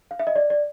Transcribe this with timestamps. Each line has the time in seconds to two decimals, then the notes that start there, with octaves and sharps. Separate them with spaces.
0.11 F5
0.19 E5
0.27 D#5
0.36 D5
0.50 D5